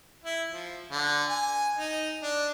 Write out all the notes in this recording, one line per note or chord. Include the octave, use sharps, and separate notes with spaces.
E4
F3
D3
G#5
D#4
D4